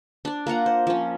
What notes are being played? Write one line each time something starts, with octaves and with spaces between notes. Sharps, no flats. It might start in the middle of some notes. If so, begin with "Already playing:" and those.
D4 D5
A#3 F4 F#5 A#5
C5
F3 C#4